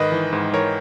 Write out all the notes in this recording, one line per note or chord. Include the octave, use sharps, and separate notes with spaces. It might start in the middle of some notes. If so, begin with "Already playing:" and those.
Already playing: G#2 D#3 B4 D#5
E3
G#2
E3 A#4 C#5